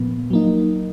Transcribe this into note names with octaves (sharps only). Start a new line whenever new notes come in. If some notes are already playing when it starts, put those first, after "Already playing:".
Already playing: A#2 F3 B3
F#3 A#3 D#4